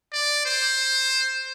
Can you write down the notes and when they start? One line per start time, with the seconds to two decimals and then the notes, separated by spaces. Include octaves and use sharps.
0.13 D5
0.46 C5